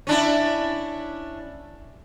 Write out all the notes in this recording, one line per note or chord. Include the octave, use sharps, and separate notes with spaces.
C#4 D4 E4